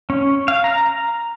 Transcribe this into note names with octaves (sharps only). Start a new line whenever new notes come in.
C#4
F5
A#5